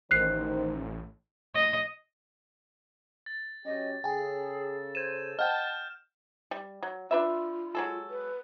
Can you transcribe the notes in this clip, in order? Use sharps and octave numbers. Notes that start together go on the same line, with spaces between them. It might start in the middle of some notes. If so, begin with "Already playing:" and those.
A1 D#3 C5 F#6 C7
D#5
A6
F#3 C#4 G4 D#5
C#3 G#4 A4 G5 G#5
C5 G#6 D#7 E7
D#5 F#5 G5 A5 F6 G6
G3
F#3
D4 F4 B4 E5
F#3 G#3 A4
B4